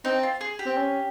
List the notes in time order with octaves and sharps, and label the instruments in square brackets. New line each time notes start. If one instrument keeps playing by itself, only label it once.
[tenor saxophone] C4 [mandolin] D#4
[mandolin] F4
G#4
G4
[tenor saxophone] C4
C#4